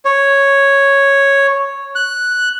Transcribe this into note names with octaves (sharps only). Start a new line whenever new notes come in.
C#5
F#6